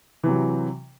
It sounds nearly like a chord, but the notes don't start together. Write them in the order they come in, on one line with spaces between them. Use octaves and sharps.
E3 C3 F#3